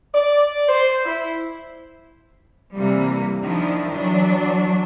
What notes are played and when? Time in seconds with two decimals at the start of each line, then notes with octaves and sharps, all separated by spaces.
0.13 D5
0.68 C5
1.05 E4
2.75 C3 E3 G3 A#3
3.42 D#3 F3 D4 E4
3.91 E3 F#3 D4